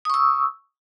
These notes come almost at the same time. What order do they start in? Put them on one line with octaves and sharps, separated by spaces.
D#6 C#6 E6